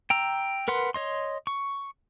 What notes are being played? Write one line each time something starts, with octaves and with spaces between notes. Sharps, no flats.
G5 A#5 E6
A#4 B4 F#5 C6
C#5 D#5 C6
C#6